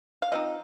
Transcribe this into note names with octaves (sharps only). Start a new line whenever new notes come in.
F5
F3 C4 D#4 D#5